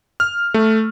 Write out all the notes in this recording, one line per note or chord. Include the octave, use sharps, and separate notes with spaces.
F6
A3